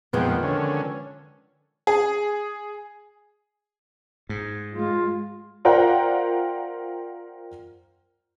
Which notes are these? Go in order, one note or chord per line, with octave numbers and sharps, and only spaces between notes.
F2 A#2 D#3 F3 G#3 B3 B4 G5
D3 C#4
G#4
G#2
G#3 F4
F4 A#4 C5 D5 F#5 G5